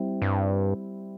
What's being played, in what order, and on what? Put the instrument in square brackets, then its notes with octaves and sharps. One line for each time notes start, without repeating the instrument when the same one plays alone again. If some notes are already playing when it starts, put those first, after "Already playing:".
Already playing: [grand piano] G3 C4 E4
[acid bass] G2